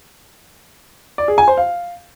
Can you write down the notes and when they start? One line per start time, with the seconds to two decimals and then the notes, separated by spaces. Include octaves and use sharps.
1.18 D5
1.28 G#4
1.38 G#5
1.48 C5
1.57 F5